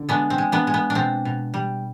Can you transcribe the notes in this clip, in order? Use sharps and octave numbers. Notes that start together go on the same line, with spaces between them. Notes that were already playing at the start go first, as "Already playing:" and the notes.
Already playing: D3
G#3 B3 D4
C4
G#3
B3 D4
G#3
B3
D4
B2 C4
B2
G3